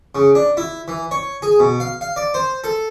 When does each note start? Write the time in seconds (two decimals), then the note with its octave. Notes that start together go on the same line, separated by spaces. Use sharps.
0.15 C#3
0.35 D4
0.57 E4
0.88 E3
1.11 C#5
1.42 G#4
1.60 B2
1.80 F5
2.01 F5
2.16 D5
2.34 C5
2.64 A4